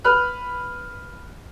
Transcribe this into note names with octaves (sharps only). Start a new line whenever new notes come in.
B4 B5 F6 F#6